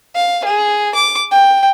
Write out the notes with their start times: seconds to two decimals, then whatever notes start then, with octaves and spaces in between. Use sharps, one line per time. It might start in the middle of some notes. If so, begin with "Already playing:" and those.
0.15 F5
0.45 G#4
0.95 D6
1.32 G5